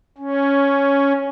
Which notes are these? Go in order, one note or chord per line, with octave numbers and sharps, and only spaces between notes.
C#4